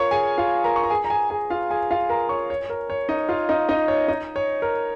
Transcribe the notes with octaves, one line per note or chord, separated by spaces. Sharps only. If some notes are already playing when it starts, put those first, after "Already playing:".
Already playing: F4 A#4 C#5 C#6
G#4 G#5
F4 F5
A#4 A#5
C#6
A#5
G#4 G#5
A#5
G#4 G#5
G#4 G#5
F4 F5
G#4 G#5
F4 F5
A#4 A#5
C#5 C#6
C#5
A#4
C#5
D#4 D#5
F4 F5
D#4 D#5
D#4 D#5
C#5
D#4 D#5
C#5
A#4